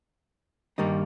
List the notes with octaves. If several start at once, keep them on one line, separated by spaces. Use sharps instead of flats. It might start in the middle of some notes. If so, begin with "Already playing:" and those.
G2 D#3 G3 A#3 D#4